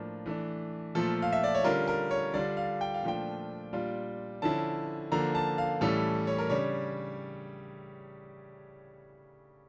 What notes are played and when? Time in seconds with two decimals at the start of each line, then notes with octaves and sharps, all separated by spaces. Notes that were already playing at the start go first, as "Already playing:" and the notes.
Already playing: A2 F3 A#3 D4
0.26 E3 A3 D4
0.95 A#2 F3 A3 A4
1.22 F5
1.32 E5
1.44 D5
1.54 C#5
1.64 D3 G3 C#4 F4 A#4
1.88 A#4
2.11 C#5
2.34 D3 G3 D4 F4 D5
2.57 F5
2.81 G5
2.94 F5
3.03 A#2 F3 A3 D4 F4 G5
3.73 A#2 G3 D4 F4
4.42 D3 F3 C#4 E4 A5
5.12 D3 F3 A#3 A#5
5.35 A5
5.58 F5
5.81 A2 E3 G3 C#4 A4
6.27 C#5
6.38 A#4
6.50 C#3 G3 D4 C#5